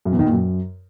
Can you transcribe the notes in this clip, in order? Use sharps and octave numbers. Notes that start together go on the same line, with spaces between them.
F#2
E2
D#3
A#2
F#2